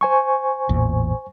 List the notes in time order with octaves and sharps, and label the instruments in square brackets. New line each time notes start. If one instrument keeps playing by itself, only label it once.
[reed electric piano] C5 G#5 C#6
[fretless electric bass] A1 E2 A#2